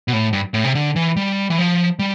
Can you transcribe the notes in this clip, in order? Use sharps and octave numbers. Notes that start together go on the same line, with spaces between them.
B2
A2
G2
A2
C3
D3
E3
G3
E3
F3
G3